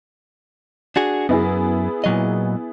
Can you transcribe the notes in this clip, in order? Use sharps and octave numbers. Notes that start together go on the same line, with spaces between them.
D4 F#4 G#4
F#2 B3 E4 G#4
A#2 F#3 D#5